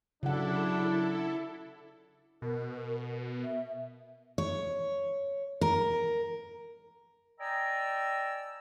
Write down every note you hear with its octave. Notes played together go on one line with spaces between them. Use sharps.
C#3 F#3 D4 E4 A4 F#5
B2 A#4
E5
C#5
A#4
D5 D#5 G5 G#5 A#5 E6